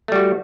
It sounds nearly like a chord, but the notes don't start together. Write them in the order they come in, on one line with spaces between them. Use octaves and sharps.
A3 G3 F#4